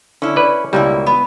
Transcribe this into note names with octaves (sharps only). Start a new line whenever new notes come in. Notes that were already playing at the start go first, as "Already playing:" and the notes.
D3 C#4 E4
B4 D5
C#2 B2 G3 A#3 E4
B3